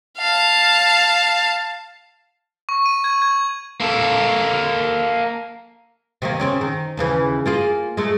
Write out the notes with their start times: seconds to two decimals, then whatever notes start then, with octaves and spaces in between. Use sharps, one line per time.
0.18 F5 A5
2.69 C#6
2.86 D#7
3.04 G#6
3.22 G#6
3.80 A#3 A4
6.22 C3 D#3 A#3
6.39 C#3 C4 C#4
6.61 D#3
6.97 D#2 C#3 E3
7.46 A#3 F4 G#4
7.97 G#3 A3 A4